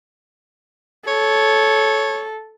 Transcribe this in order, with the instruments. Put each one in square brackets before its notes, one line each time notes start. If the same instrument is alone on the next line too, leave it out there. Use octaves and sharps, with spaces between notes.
[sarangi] A4 [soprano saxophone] C#5